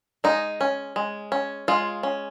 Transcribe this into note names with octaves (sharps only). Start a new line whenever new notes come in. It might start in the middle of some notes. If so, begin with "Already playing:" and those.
G#3 D#4
C#4
G#3
C#4
G#3 F4
C#4